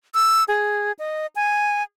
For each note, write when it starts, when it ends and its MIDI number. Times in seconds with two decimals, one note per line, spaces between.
0.14 0.44 88
0.48 0.92 68
0.99 1.26 75
1.36 1.83 80